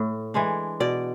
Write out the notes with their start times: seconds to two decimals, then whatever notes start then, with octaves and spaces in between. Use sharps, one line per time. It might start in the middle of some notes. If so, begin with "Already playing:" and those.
Already playing: A2
0.34 E3 G#3 D4
0.80 B2 D5